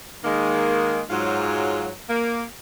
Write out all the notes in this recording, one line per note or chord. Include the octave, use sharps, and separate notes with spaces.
D#3 G#3 A#3
G#2 F#3 F4
A#3